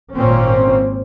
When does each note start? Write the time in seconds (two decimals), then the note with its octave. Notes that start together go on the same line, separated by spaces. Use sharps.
0.14 G#1 A#2 A#3 C4 C#4